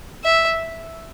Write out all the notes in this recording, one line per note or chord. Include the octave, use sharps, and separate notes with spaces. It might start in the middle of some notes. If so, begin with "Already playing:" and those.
E5